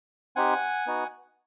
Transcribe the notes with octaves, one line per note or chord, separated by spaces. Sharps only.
C4 D#4 G4 F#5 G#5
B3 D#4 F#4